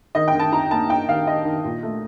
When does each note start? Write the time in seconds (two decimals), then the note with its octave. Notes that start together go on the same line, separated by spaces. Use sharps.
0.15 D#3 D#5
0.28 G5
0.34 D#3
0.39 A5
0.52 D#4 A#5
0.70 A#3 A5
0.90 D#4 G5
1.08 D#3 F5
1.27 D#3 D#5
1.45 D#3
1.64 A#2
1.83 A3